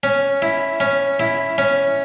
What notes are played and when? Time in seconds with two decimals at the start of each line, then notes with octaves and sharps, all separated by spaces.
0.03 C#4
0.42 E4
0.80 C#4
1.20 E4
1.58 C#4